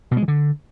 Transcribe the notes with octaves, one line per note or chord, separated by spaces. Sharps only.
B2
G#3
E3
D3